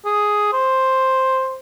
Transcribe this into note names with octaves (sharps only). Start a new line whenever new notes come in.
G#4
C5